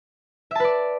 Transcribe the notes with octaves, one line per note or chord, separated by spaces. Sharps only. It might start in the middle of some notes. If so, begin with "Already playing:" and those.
B4 D5 E5 A5